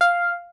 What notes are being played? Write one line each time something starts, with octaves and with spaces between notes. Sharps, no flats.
F5